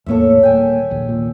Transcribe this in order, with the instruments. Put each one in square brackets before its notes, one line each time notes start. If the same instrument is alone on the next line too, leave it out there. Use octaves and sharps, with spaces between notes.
[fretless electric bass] E2 A2 A#3 [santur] A4 C#5 E5
[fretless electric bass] D#1 A#3 [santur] G5 G#5
[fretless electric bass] A#1 D#2
A#2